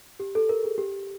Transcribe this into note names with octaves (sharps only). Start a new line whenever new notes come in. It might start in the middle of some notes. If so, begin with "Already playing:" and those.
G4
A4
A#4
G#4
G4